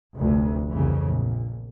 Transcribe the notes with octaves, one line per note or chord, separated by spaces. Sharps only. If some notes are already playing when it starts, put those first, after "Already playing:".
F1 D2
C2 F2 C#3 E3
A#1